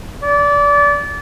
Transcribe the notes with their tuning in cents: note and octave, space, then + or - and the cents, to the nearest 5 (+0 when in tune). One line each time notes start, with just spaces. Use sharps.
D5 -25